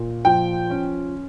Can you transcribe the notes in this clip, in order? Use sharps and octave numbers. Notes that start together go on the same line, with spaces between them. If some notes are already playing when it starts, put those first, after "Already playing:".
Already playing: A#2
F3 G5
C#4